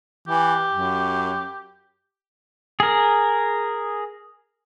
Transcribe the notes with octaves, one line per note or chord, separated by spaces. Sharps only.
E3 G4
F#2
G#4 A#4